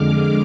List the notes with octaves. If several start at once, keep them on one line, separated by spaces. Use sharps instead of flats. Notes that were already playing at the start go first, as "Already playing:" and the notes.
Already playing: F2 D3 G#3 D6 F6